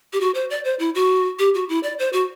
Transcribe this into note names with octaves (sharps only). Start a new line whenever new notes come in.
G4
F#4
C5
D5
C5
E4
F#4
G4
F#4
E4
D5
C5
F#4